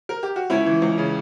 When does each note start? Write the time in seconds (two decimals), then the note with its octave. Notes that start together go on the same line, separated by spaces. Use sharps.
0.09 A#4
0.23 G4
0.36 F#4
0.50 C#2 C#4 E4
0.66 E3
0.82 C#2
0.98 C#3